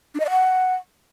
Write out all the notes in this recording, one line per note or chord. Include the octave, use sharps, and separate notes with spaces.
D4
D#5
D5
F#5